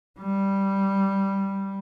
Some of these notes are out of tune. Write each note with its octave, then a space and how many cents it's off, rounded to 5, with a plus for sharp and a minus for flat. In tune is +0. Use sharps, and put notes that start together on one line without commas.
G3 -5